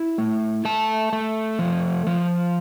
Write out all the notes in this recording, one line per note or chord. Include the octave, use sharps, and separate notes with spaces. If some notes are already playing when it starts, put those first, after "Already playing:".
Already playing: E4
A3
A3 A5
A3
F3
F3